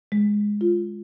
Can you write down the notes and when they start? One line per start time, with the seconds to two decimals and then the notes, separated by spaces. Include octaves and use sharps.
0.12 G#3
0.61 F4